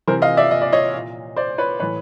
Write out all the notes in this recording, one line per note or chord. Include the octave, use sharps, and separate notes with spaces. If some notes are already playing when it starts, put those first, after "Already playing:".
C3 E3 A#4 C5
D#5 F5
D5 E5
D#5
D5
C#5 D#5
A#2
C5 D5
B4 C#5
A2 E3 B4 C#5